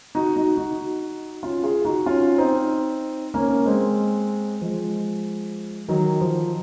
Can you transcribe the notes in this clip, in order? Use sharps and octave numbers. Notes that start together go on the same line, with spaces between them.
D#4 F#4
D#4 F#4
D#4 F#4
C#4 F4
F4 G#4
D#4 F#4
C#4 F4
C4 D#4
A#3 C#4
G#3 C4
F3 G#3
D#3 F#3
F3